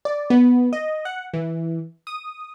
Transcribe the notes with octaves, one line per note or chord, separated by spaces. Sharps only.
D5
B3
D#5
F#5
E3
D#6